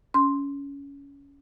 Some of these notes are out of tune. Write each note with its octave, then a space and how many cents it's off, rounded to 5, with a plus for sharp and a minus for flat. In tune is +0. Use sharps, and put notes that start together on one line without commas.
C#4 +20 C6 +0